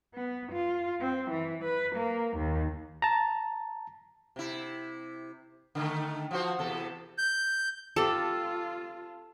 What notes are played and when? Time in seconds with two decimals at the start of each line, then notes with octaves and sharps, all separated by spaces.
0.15 B3
0.53 F4
1.01 C4
1.31 E3
1.64 B4
1.96 A#3
2.37 D#2
3.02 A5 A#5
4.36 C3 E4
5.75 D3 D#3 A3
6.31 F3 F#4 C5
6.59 E2 C3 A4
7.18 G6
7.96 C4 F4 G4 A4 A5